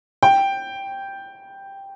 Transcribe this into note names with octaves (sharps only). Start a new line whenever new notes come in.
G5